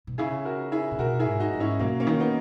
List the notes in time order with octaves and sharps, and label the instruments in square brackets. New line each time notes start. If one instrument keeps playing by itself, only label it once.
[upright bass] B2
[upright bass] C#3 [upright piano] E4 G#4
[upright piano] F#4 A#4
E4 G#4
[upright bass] A#2
[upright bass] B2 [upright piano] F#4 A#4
[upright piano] E4 G#4
[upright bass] G#2
[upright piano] D#4 F#4
[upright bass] G#2
[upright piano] C#4 E4
[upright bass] B2 [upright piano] F#3 A#3
[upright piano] A#3 C#4
[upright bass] D#3
[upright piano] B3 D#4